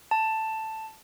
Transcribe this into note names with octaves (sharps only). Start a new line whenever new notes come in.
A5